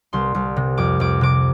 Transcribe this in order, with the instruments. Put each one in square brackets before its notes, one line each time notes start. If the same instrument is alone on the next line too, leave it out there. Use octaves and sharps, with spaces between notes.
[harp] C2 C6
C2
C3
F2 D6
F2 D6
C3 D6